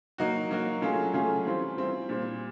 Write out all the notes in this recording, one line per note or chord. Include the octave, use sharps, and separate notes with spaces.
F#3 A#3 D#4 F#4
F#3 A#3 D#4 F#4
F#3 A3 C#4 F4 G#4
F#3 A3 C#4 F4 G#4
E3 G3 C4 F4
E3 G3 C4 F4
A#2 G3 C4